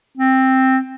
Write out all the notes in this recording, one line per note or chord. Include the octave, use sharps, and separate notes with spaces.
C4